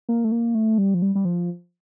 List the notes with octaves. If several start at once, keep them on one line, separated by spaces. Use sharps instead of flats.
A#3
A3
A#3
A3
G3
F3
G3
G3
F3